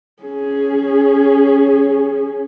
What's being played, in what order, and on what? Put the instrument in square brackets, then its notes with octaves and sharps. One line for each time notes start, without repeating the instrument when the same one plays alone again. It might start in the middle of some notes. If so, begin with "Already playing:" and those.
[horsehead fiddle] C#4 G#4